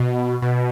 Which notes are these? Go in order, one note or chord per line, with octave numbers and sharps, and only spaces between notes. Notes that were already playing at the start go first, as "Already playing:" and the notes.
Already playing: B2
B2